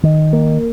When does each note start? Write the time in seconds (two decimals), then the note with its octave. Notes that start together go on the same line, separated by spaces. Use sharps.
0.03 D#3
0.33 A#3